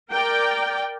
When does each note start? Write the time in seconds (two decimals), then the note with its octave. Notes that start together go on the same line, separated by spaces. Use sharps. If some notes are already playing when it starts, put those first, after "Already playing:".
0.13 A#4 D5 G5